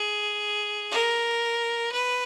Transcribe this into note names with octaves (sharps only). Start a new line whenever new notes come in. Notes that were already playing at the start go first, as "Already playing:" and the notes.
Already playing: G#4
A#4
B4